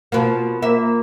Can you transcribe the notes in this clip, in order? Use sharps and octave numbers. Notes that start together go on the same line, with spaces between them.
B2 F3 A#3
A#3 E5